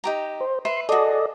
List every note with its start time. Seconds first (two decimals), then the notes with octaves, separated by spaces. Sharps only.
0.04 D#4 G4 A#5
0.41 C5
0.65 B4 E5 B5 C6
0.89 F#4 G#4 A4 D5 D#5